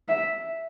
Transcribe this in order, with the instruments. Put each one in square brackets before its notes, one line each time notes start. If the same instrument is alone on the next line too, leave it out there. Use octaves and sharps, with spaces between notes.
[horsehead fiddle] E5